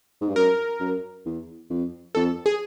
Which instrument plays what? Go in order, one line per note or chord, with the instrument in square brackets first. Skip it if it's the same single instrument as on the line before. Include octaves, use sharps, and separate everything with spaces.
[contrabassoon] G#2
G2
[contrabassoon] F#2 [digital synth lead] A#4
[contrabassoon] F#2
E2
F2
[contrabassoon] F2 [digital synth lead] A4
[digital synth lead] G#4